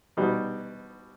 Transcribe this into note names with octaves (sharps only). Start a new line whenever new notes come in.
B2 G3 D#4